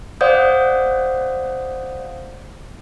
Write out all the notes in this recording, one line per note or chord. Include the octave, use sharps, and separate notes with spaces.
C5 D5 F5 F#5 D#6 G6